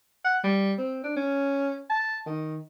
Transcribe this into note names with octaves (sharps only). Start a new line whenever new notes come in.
F#5
G3
C4
D4
C#4
A5
D#3